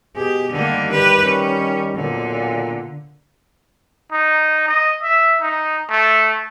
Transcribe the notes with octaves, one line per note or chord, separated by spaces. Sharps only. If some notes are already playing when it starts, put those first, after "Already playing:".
B2 G4 G#4
D3 D#3 G3 A#3
G4 B4
C#4
B1 A#2 D3
D#4
D#5
E5
D#4
A3